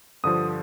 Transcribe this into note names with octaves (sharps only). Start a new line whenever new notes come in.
G2 D3 F3 D#6